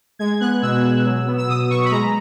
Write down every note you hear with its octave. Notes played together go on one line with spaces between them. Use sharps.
G#3 G#6
B3 F#6
B2 E6
B2
F#3
B3
E6
B2 D#6
B2 C#6
B5
G#3 A#5